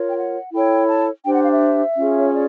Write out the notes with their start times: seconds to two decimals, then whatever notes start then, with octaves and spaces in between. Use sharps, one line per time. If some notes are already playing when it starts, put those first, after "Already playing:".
Already playing: F4 A#4 C#5
0.09 G5
0.16 F#5
0.52 E4 A4 C#5 G5
0.88 A5
1.24 D4 G4 C5 G5
1.33 F#5
1.43 F5
1.51 E5
1.97 C#4 F4 G#4
2.19 C#5
2.33 D5